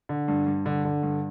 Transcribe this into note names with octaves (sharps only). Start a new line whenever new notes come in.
D3
G2
G2
D3
D3
G2